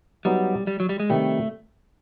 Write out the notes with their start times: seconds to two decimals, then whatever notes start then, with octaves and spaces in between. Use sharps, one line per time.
0.25 F#3 G3 B3 D#4
0.67 G3
0.80 F#3
0.89 G3
1.00 G#3
1.10 C3 D#3 G3 A3